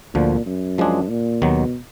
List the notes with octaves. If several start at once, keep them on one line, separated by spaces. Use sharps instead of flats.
D2 A#2 D3 F3
F#2
F3 G#3 D4 G#4
A#2
D#2 B2 D#3 F#3